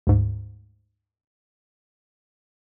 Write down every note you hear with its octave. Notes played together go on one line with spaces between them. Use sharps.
D2 G#2